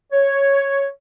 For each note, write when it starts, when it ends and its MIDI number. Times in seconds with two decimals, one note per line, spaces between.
0.12 0.88 73